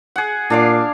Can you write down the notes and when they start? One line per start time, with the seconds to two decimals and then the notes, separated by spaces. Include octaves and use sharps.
0.16 G#4 F#5
0.50 A#2 D4 F5 D6